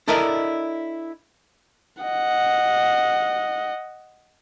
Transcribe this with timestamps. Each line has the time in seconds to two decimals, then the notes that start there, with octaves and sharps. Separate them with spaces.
0.08 D4 E4 A4 A#4 D5 D#5
2.03 D#5 F#5